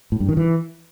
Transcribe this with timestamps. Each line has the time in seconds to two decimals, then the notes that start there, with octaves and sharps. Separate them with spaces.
0.12 A2
0.20 G2
0.29 D#3
0.37 E3